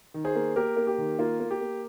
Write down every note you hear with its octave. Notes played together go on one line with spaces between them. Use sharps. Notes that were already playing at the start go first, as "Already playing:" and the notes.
D#3
G#4 C5
A#3
A#3 G4 A#4
A#3
G4
D#3
A#3 F4
A#3
G4
A#3